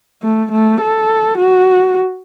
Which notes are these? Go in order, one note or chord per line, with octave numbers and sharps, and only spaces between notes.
A3
A3
A4
F#4